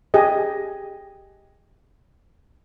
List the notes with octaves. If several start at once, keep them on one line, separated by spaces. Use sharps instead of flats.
G4 G#4 D#5